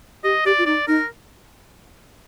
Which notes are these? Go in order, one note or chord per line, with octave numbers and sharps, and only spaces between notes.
G4 D#5
G4 D5
F4
D#4 D5
D#4 A#4